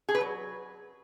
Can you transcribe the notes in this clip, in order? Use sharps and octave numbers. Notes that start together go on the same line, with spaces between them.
G#4
B4
F#3